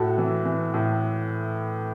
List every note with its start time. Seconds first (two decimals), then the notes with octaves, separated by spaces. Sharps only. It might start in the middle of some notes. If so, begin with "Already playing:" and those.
Already playing: A2 F#4 A4
0.18 E3
0.45 E3
0.74 A2